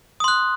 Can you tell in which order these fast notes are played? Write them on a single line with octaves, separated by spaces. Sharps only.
D#6 C6 F#6